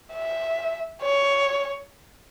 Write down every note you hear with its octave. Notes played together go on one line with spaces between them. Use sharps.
E5
C#5